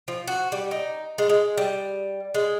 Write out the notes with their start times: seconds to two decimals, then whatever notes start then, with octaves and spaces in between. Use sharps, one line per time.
0.08 F3
0.28 F#4
0.52 G3
0.71 D#4
1.18 G#3
1.29 G#3
1.57 G3
2.34 G#3